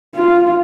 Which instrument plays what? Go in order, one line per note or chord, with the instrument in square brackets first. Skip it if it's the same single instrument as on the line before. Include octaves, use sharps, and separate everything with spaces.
[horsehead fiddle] F4